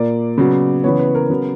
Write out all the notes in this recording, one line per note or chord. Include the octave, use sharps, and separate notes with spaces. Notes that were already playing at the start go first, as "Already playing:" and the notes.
Already playing: A#2 A#3 D5
C#3 F#3 B3
C#3 E3 B3 C#5
B4
A#4
C#3 F#3 B3